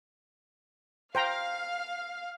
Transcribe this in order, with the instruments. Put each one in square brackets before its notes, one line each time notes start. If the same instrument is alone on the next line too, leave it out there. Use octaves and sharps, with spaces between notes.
[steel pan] C5 G5 A#5 [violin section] F5